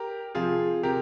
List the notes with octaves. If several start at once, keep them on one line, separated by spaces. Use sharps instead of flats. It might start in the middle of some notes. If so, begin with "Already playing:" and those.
Already playing: G4 A#4
C3 F3 F4 G#4
C3 G4 A#4